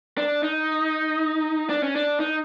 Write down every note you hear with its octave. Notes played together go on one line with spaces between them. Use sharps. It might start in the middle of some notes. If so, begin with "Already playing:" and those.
D4
D#4
D4
C#4
D4
D#4